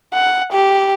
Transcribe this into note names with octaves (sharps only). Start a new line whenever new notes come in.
F#5
G4